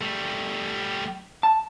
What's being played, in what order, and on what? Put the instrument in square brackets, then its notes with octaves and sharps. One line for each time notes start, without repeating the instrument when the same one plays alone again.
[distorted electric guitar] G3 A3
[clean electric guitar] A5